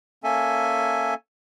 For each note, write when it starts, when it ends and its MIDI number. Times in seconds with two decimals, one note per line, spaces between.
0.24 1.14 58
0.24 1.14 61
0.24 1.14 69
0.24 1.14 76
0.24 1.14 80